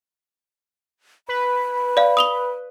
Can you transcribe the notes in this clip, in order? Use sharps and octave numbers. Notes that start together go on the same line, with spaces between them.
B4 B5
D5 F5
D#6 F7 G7